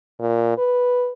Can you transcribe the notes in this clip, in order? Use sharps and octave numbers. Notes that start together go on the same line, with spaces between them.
A#2
B4